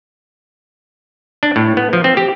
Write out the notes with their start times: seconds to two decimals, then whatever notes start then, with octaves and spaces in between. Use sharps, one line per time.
1.43 D4
1.56 A2
1.77 B3
1.93 F3
2.04 C4
2.17 G4